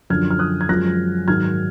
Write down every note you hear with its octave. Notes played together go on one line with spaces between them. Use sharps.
F#2 D3 F3 F6 G#6
F6
D#6 F#6
G#6
F#2 F3 G#3 F#6 A#6
G#2 D#3 F#3 F6 G#6